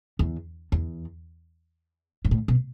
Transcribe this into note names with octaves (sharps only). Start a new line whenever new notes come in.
E2
E2
G2
A2
B2